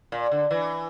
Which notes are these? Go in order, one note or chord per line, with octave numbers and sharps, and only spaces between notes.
A#2
D3
E3